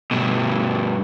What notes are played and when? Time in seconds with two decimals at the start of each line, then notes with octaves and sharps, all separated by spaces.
0.11 G2 B2